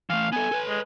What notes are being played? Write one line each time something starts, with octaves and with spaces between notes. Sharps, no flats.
E3 A3 F5
B3 A4 G#5
A4 B4
G#3